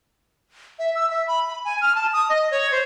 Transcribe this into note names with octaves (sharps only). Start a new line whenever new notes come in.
E5
E6
E5
B5
B5
G#5
F6
A5
D#6
D#5
C#5
C5